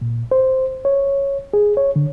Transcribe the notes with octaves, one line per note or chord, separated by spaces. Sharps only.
A#2
C5
C#5
G#4
C#5
D3